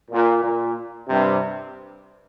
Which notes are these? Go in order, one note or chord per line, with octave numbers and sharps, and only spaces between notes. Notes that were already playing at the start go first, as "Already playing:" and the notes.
A#2
A#2
G2 C3